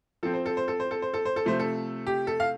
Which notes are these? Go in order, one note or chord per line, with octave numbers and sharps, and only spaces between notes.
F3 C4 A4
C5
A4
C5
A4
C5
A4
C5
A4
C5
A4
C3 F3 A3 C5
A4
G4
A4
F5